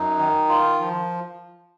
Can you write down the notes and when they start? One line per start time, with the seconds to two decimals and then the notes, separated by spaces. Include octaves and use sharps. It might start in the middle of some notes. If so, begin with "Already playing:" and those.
Already playing: F#2 D#4
0.19 D#3
0.49 F4
0.80 F3